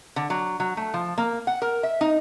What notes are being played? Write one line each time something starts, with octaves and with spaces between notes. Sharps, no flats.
D3
F#3
F#3
A3
F3
A#3
F#5
A#4
E5
D#4